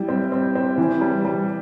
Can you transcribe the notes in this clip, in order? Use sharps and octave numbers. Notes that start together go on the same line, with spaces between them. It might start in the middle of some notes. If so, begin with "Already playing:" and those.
Already playing: G3 E4
C4
C4
C4
E3
G3
G3